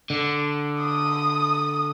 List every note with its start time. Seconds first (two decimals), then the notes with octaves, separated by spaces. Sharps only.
0.10 D3
0.81 D#6